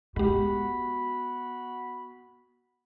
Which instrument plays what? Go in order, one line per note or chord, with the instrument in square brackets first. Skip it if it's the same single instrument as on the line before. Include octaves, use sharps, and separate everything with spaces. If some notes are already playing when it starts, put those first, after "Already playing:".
[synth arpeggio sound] G#3 G4 [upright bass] B3 [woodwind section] F#4 B5